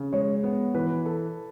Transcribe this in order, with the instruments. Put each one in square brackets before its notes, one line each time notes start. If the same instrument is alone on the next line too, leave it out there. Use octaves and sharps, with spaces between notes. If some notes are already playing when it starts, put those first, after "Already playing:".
Already playing: [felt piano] C#3
[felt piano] G#3 [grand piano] C#5
[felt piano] B3
[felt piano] E3 [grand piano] B4
[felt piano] A4